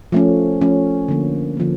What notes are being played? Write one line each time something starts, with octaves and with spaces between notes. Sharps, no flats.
F3 A3 C#4
F3 A3 C#4
D3 F3 A#3
D3 F3 A#3